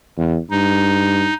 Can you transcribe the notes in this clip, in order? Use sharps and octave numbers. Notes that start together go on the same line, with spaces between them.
E2
G2 D#4